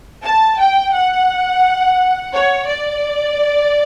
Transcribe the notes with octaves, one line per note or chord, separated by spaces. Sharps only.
A5
G5
F#5
C#5
D5